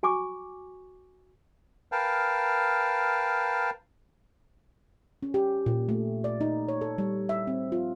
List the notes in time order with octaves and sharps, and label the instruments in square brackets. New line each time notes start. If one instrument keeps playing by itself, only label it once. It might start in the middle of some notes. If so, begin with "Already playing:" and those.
[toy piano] F#4 G#5 C#6 D6
[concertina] A#4 B4 F5 G5 A5
[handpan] C#4
G4
A#2
A3
D5
D#4
C#5
A4
G3
E5
C4
F4